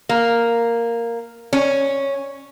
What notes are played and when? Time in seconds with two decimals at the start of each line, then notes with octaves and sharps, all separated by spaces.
0.09 A#3
1.53 C#4